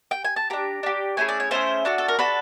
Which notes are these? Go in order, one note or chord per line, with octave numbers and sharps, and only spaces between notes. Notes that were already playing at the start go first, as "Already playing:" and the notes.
G5
G#5
A5
D4 G4 A#5
D4 G4
A3 C#4 E4 G#4 G#5
D5
C#5
A3 C#4 E4 G#4 C5
D4 F#4 A4
A4
A#4
D4 F#4 A4 B4